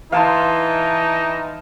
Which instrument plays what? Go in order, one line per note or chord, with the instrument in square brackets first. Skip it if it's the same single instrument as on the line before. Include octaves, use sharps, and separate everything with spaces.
[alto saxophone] E3 [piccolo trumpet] D#4 [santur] F5 A5 C6